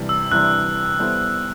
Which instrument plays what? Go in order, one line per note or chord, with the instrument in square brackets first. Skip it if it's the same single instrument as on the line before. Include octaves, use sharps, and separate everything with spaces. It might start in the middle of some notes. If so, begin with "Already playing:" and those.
Already playing: [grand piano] C3 E3 G3 D4
[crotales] E6
[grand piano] C3 E3 G3 D4 [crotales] F#6
[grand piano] G3 B3 E4 A4 C5